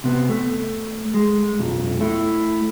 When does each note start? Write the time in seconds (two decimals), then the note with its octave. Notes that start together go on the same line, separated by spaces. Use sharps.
0.04 C3 B3
0.29 A3
1.14 G#3
1.59 B1 F2
2.01 A3 E4